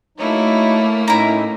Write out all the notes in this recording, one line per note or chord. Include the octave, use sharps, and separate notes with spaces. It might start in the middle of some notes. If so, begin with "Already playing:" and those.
F#3 A3 A#3 D#4 E4 C#5
A2 C#4 D#4 E4 A#5